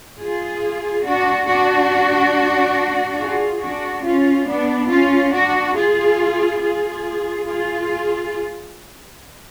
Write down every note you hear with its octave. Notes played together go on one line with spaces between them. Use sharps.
F4 G#4
D4 F#4
D4 F#4
F4 G#4
D4 F#4
C#4 F4
B3 D4
C#4 F4
D4 F#4
F4 G#4
F4 G#4
F4 G#4